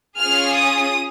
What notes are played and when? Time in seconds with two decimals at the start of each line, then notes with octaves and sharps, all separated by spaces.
0.19 C#4 F4 G#4 F6
0.55 D#6